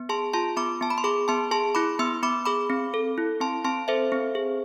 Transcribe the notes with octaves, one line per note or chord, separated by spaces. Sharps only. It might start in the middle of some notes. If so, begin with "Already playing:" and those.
Already playing: B3
G#4 A5 C6
F4 A5 C6
B3 B5 D6
B3 A5
B5
C6
G#4 B5 D6
B3 A5 C6
G#4 A5 C6
E4 B5 D6
B3 C6 E6
B3 B5 D6
G#4 B5 D6
C4
A4
E4
C4 A5 C6
C4 A5 C6
A4 C5 E5
C4
G#4